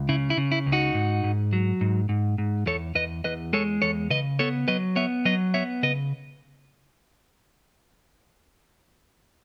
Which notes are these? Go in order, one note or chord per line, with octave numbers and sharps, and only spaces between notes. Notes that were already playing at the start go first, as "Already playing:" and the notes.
Already playing: C#2
C#3 E4
E4
C#3
E4
C#2
D#4 F#4
G#2
G#2
F#3
G#2
G#2
G#2
E2 A4 C#5
E2 B4 D#5
E2 B4 D#5
G#3 A4 C#5
E2 A4 C#5
C#3 B4 D#5
B3 A4 C#5
F#3 B4 D#5
B3 C#5 E5
F#3 B4 D#5
B3 C#5 E5
C#3 B4 D#5